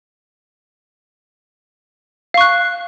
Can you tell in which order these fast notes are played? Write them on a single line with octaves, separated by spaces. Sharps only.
F5 C#6 F#6